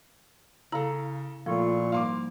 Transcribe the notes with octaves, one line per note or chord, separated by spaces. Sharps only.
C#3 E4 A4 F5 A#5
A#2 F3 A3 E4 F4 C#6
G#2 G3 A#3 F5 C6 D6